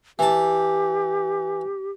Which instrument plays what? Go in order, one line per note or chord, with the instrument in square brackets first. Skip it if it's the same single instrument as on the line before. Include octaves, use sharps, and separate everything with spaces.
[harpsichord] E3 A5 [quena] G4